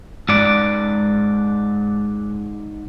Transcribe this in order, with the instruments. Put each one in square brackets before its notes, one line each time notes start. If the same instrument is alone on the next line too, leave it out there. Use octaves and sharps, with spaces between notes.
[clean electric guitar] G#2 D5